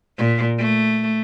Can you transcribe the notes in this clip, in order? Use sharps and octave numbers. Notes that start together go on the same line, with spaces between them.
A#2
A3